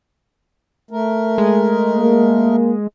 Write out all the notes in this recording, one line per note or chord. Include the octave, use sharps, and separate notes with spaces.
A3 A#4
G#3
A#3